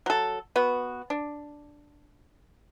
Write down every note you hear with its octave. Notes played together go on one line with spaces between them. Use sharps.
F#3 A4
B3 F#4
D4